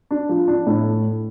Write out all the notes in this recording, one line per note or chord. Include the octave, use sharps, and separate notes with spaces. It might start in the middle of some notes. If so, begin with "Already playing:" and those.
D4
F3
D4
A2